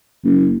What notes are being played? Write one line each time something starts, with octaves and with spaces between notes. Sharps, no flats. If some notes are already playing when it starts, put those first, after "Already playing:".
F#1